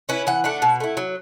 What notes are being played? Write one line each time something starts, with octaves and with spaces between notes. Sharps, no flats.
C#4 E4 B4
E3 F#5
A3 D4 F#5
B2
A3 E4
F#3